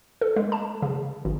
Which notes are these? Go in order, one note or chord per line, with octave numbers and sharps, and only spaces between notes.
A4
G#3
A5
C#3
G#1